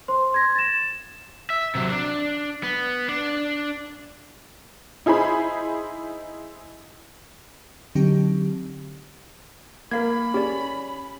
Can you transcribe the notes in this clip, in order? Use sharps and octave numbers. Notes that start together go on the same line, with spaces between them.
C5 C6
C6 G#6 A#6
A6 E7
E5
C3 F#3
D4
B3
D4
D#4 E4 G#4 C5 B5
D3 F#3 C4 D#4 G4
A#3 A#4 F5 B5 G#6
C#4 G4 G#4 D5